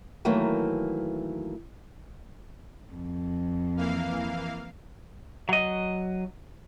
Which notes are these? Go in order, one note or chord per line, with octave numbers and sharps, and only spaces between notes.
D#3 E3 F#3 A3 A#3
F2
E3 A#3 F5
F#3 D#5